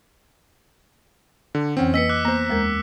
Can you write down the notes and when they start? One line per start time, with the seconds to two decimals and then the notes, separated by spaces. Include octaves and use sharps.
1.55 D3
1.77 F2 E3 C4 C#4 G5
1.94 A#3 B4 D#5 E6 B6 C#7
2.09 D6 E6 F#6
2.25 A#3 B3 C5 A#5
2.49 D#2 G#3 A#4